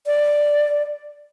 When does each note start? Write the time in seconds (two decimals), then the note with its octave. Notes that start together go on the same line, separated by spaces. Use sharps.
0.07 D5